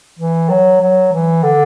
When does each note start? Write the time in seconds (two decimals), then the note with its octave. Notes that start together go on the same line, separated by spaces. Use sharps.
0.19 E3
0.50 F#3
0.81 F#3
1.12 E3
1.43 D3